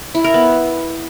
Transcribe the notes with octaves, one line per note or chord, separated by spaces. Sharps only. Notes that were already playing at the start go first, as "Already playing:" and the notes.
E4
A#4
B3